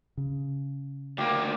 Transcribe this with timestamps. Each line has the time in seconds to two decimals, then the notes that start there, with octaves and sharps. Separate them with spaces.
0.17 C#3
1.18 D2 A#3 G4